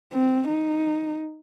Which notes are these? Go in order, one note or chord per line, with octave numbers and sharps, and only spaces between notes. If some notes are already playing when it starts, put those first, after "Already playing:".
C4
D#4